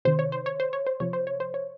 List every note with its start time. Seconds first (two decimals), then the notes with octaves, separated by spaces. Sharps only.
0.05 C3 D#3 C5
0.19 C#5
0.32 C5
0.46 C#5
0.60 C5
0.73 C#5
0.87 C5
1.00 C3 F3 C#5
1.13 C5
1.27 C#5
1.40 C5
1.54 C#5